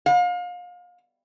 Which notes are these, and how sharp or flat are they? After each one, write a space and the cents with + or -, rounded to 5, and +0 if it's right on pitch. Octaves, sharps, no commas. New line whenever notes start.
F5 +35